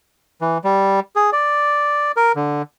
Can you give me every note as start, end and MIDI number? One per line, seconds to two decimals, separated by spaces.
0.41 0.58 52
0.64 1.00 55
1.16 1.30 68
1.33 2.12 74
2.17 2.32 70
2.35 2.62 50